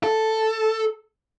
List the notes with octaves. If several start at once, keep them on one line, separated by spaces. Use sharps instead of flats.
A4